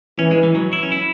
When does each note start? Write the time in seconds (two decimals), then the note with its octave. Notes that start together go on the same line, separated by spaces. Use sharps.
0.18 E3 C#4
0.31 G#3
0.43 E3
0.55 F#3
0.73 E4
0.83 C#4
0.92 E4